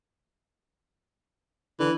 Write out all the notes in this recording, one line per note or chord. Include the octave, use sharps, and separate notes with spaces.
D3 E3